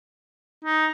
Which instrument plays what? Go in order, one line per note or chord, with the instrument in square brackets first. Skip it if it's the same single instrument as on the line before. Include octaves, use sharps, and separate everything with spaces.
[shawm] D#4